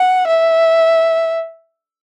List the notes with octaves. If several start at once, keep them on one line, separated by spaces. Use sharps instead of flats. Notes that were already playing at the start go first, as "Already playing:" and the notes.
Already playing: F#5
E5